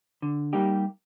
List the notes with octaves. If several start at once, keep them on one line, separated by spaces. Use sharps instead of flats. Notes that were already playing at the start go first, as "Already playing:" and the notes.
D3
G3 A#3 D#4 G4